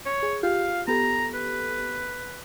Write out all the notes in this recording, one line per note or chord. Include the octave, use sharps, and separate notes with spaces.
C#5
G#4
F4 G4 F5
B3 G4 A4 A#5
B4